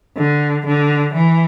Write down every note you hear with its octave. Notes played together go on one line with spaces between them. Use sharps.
D3
D3
E3